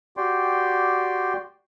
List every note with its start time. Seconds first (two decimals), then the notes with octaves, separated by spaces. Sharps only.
0.17 F#4 G4 D5 G5 C6